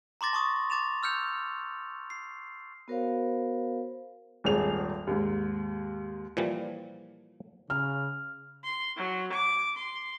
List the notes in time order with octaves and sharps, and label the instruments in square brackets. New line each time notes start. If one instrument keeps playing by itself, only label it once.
[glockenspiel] A#5 C6 D6 A6 A#6
A5 C#6 D#6
D6 A6 E7 F7
E6 F6 G6 C#7 F7
C7
[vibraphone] B3 F#4 A#4 C5 C#5 F5
[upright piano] D#1 G#1 G#4 F7
D#2 G#2
[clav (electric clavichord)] A#2 E3 F3 G3
[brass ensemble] C#3 [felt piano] F6
[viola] C6
F#3
D6
C6